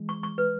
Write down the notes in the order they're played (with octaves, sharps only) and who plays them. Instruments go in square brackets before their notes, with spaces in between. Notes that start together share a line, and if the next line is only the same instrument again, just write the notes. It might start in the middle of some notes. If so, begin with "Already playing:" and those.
Already playing: [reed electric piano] E3 G#3
[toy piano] C#6
C#6
B4